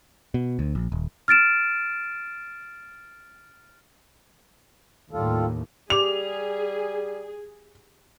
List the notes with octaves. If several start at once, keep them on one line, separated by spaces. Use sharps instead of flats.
B2
D2
A#1
D#1
F6 A6 D7 E7
D#2 A2 G3 F4 A4
G3 G4 G#4 D6 F7